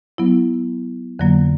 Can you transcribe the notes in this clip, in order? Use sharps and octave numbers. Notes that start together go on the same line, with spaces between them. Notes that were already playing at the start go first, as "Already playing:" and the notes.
F#3 B3 E4
F2 D3 F#3 A#3